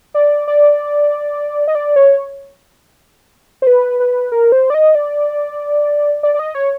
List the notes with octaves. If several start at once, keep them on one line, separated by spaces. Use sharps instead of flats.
D5
D5
D#5
D5
C#5
C5
B4
B4
A#4
C5
D5
D#5
D5
D5
D5
D#5
C#5